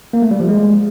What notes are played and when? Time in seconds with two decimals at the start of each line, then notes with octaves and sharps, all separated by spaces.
0.13 A#3
0.22 A3
0.31 G3
0.40 F3
0.49 G#3